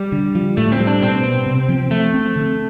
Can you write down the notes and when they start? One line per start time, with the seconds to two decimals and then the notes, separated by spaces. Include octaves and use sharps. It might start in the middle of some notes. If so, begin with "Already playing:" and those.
Already playing: G3
0.12 D3
0.35 F3
0.57 A2 A3
0.72 C4
0.80 G3
0.87 D4
1.02 B2 C4
1.24 B3
1.46 C3
1.69 F3
1.91 F3 A3
2.14 C4
2.36 D3